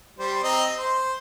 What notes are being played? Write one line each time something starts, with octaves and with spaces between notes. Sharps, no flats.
G3 C5
C4 D#5 A#5
C5